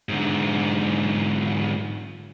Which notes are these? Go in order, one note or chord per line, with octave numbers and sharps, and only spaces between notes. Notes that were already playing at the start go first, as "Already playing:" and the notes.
G#2 D3